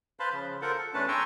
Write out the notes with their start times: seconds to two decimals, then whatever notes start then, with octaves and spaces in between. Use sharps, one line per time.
0.20 B4 C5 F5 A5 B5 C6
0.32 C#3 F3
0.61 F4 A4 A#4 C5 F#5
0.78 A4
0.94 E2 A3 C#4 D4 B4 A5
1.08 G5 G#5 A#5 C6 C#6 E6